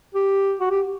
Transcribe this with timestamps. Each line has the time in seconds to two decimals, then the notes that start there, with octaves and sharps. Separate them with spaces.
0.15 G4
0.60 F#4
0.70 G4